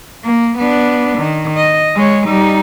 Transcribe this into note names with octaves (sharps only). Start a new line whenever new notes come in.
A#3
B3 D4
D#3
D#5
G#3 C#5
G3 D#4